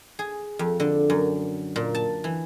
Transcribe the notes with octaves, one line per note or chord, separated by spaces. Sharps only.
G#4
F2
D3
F#2
A#2
A5
E3